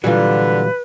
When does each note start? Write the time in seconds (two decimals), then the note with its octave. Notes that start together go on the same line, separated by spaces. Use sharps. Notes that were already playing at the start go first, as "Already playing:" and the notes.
0.04 A#2 D3 E3 F#3 G3 F4 B4